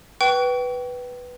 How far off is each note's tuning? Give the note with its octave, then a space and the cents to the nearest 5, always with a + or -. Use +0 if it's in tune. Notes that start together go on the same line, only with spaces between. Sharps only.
B4 +0 G5 -25 C#6 +30